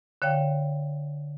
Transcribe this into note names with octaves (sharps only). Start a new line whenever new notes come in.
D3 C#5 F5 G5